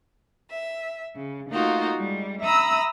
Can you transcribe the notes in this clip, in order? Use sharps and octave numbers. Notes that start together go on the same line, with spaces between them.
E5
C#3
A3 A#3 D#4 F4 F#4
G3 G#3
E5 A#5 B5 D#6 E6